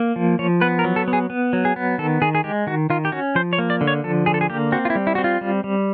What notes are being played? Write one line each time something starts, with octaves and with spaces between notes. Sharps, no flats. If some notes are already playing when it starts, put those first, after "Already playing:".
Already playing: A#3
F3
F3 C#5
B3 B4
A#4
F#3
A4
B3
G#4
B3
F#3
G#4
B3
D#3 A4
D#3 G#4
G#4
G#3 G4
D#3 F#4
D#3 F4
G4
C#4 F#4
F3 C5
C#5
A#3
D5
D3
C#5
F3 A4
D3 G#4
A4
G#4
A#3 G4
C4 F#4
F4
E4
G3
E4
C4 F#4
F4
G3
G3